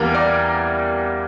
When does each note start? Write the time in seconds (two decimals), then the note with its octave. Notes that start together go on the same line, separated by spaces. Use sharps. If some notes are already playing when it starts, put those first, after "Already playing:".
Already playing: E2 E3 G3 A#3 A#4
0.14 D5